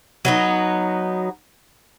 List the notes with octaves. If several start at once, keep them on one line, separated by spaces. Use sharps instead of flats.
F#3 B3 D#4